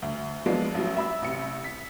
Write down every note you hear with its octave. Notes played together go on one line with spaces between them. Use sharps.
D2
F3 F#3 G#3 A#3 B3 D4
A1 F#3
E5 B5 E6
A1 C3 C#7
B6